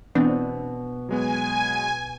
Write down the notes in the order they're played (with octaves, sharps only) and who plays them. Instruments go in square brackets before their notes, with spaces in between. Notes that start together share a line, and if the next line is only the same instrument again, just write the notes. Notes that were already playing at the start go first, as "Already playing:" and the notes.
[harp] B2 [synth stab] E3 C4 D4
[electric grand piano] F#3 G#3 B3 [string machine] G#5